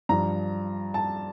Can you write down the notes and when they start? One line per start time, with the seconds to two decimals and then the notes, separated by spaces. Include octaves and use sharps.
0.09 G2 F3 A#5
0.94 A5